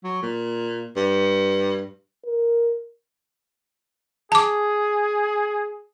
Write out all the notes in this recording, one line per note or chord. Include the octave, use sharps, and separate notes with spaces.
F#3
A#2
G2
A#4
G#4 A5 D6